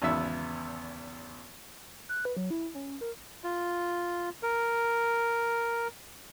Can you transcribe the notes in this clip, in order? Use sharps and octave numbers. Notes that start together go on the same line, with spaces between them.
G#1 E2 C#3 B3 E5 E6
F#6
B4
F#3
E4
C#4
A#4
F4
A#4